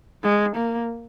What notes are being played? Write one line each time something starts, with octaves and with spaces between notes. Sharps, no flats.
G#3
A#3